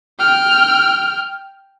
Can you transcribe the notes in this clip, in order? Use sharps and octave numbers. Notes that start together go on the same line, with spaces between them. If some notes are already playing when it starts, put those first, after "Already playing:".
G5 F6